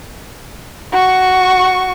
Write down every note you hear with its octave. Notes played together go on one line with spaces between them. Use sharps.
F#4 C#6